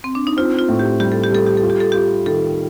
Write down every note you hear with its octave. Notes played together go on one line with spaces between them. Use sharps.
C4
D4
D#4
C4 F4
F4
A2
G4
G3 G4
A4
G4
G3 A4
G4
A4
F4
G4
A4
F4 G4
D#3 A4